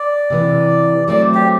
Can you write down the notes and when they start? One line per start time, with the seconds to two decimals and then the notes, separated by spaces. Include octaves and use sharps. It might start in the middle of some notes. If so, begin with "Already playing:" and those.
Already playing: D5
0.30 C3 E3 B3
1.08 F#3 A3 C4 D5
1.35 G4